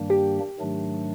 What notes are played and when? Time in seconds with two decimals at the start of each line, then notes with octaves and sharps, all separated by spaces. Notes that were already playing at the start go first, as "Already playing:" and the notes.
Already playing: G2 D#3 G3 A#3 D4
0.10 G4
0.59 G#2 D#3 F#3 A3 D4